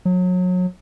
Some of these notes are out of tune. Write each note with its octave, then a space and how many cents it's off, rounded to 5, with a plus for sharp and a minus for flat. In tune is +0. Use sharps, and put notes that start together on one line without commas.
F#3 -30